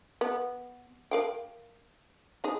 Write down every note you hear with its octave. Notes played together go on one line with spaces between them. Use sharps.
B3
A#4 F5 G5
B3 D#4 G#4